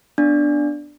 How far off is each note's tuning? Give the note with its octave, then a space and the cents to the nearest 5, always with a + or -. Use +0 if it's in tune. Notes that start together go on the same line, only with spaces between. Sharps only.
B3 +0 D4 +0 D5 +0